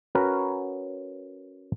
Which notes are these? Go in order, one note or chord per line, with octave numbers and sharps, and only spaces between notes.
C#4 F#4 A#4 B4